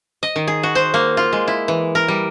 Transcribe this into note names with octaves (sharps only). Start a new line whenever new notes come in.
D#5
D#3
G#4
F#4
C5
A#3
F4
G#3
E4
E3
A#4
G3